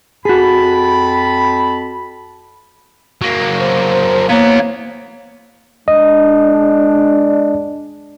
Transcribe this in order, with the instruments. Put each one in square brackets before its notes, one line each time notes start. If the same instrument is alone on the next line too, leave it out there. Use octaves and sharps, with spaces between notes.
[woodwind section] F2 A5 B5 [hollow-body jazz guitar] F#4 G#4
[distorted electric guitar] F#3 A#3
[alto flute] C5
[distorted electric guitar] E3 B3 [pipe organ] A#3 C#5 [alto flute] A#5
[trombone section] G#3 D4 [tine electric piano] D#5